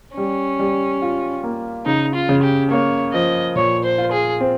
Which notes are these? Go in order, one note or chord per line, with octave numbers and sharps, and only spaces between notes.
G3 C#4
G3
F4
A#3
C#3 D#4
F4
C#3
G4
A#3 C#5
F3 D#5
A#2 C#5
C5
F4
G#4
C4